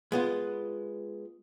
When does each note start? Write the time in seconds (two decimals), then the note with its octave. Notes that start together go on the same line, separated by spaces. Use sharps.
0.12 G#3 B3 F4